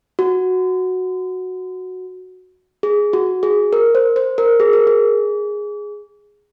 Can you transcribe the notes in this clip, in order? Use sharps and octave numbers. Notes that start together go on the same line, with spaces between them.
F#4
G#4
F#4
G#4
A#4
C5
C5
A#4
G#4
A#4
G#4